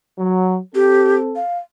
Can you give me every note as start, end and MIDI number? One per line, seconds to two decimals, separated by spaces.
0.19 0.58 54
0.75 1.41 60
0.75 1.16 67
0.75 1.41 69
1.36 1.58 77